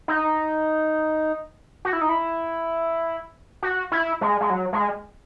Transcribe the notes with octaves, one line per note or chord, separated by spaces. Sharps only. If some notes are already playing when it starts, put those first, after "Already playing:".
D#4
F#4
E4
D#4
E4
F#4
E4
G#3
G#3
F#3
G#3